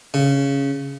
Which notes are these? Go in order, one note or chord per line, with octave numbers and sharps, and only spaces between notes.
C#3